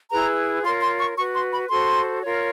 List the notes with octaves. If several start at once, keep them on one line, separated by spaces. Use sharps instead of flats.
E4 G#4 B4 A#5
F4 A#4 C#5 C6
C6
C#6
F#4 B4 C#6
C6
B5
F#4 A4 C5 C6
F4 A#4 C#5